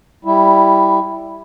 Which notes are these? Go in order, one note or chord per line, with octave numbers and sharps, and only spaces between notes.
G3 E4